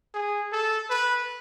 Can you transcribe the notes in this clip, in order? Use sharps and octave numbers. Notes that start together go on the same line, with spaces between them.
G#4
A4
B4